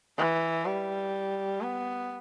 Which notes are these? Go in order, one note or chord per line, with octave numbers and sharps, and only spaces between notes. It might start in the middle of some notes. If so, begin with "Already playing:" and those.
E3
G3
B3